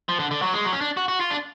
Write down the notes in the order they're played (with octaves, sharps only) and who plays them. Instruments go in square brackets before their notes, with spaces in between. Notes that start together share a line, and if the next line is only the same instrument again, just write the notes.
[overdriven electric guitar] F3
D3
D3
F#3
G#3
F#3
C#4
D4
F#4
F#4
F4
D4